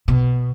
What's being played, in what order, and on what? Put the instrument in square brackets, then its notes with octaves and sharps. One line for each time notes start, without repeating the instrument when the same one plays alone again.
[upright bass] B2